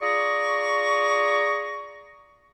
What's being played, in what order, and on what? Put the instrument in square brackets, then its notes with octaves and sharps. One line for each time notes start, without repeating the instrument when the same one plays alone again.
[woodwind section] F4 G#4 D5 A#5 C#6